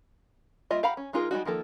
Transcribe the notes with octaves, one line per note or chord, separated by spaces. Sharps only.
G3 A#3 F4 D#5 E5
G4 F5 F#5 A#5 B5
C#4
G#3 D#4 F4 G#4 A#4
G3 G#3 D#4 F#4
D#3 F3 A#3 A4